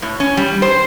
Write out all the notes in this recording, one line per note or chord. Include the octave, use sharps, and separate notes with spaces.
A2
C#4
G3
C5